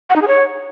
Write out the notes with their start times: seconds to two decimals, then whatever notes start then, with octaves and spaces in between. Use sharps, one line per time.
0.10 F#5
0.16 D#4
0.22 G#4
0.28 C#5